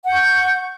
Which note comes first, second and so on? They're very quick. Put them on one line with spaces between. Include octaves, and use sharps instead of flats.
F#5 G6 C#6